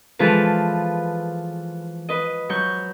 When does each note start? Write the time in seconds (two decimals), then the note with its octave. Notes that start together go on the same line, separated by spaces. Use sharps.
0.19 E3 F3 G#3 F4 A4 B4
2.09 B4 D#5
2.49 F#3 C#6 G6